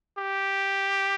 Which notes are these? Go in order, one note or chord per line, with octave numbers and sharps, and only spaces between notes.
G4